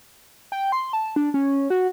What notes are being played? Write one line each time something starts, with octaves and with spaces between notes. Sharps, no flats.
G5
C6
A5
D4
C#4
F#4